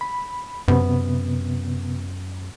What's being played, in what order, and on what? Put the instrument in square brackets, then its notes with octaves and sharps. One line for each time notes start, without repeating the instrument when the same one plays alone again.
[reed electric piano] B5
[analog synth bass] F#2 [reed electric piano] C3 B3